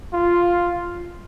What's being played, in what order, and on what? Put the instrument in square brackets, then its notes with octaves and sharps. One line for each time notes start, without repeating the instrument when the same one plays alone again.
[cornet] F4